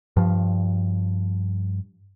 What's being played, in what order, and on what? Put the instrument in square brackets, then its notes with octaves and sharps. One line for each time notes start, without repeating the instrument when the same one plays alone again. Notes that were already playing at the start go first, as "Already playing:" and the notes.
[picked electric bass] G2 F3